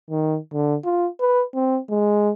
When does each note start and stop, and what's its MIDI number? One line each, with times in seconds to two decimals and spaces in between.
0.11 0.38 51
0.53 0.76 50
0.84 1.08 65
1.21 1.44 71
1.55 1.79 60
1.90 2.32 56